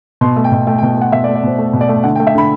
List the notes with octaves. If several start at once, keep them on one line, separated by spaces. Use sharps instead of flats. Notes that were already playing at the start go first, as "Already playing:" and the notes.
B2 C6
A3
G5
B2
A3 G5
G5
B2
A3 F#5
B2 E5
D5
A3
D5
B2 C5
A3
B2
D5
A3
D3 F#5
G5
A3
E5
D3 B5